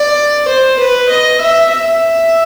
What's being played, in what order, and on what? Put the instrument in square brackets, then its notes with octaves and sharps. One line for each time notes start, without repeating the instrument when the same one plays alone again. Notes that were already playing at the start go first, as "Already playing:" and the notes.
Already playing: [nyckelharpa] D5
C5
B4
D#5
E5
E5